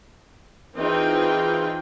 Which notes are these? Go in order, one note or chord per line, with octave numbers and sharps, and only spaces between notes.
E3 C4 D#4 F4 G#4 G5